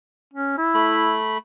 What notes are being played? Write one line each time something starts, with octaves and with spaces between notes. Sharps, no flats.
C#4
E4
A3 B5